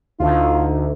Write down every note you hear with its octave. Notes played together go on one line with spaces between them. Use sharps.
D2 D#4 F4